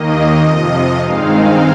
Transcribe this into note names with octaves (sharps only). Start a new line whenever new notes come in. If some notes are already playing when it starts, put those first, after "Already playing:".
Already playing: D#2 D#3 A#3 D#5
F2 C3 F3
G2 D#3 G#3 C4 D#4 F5
F5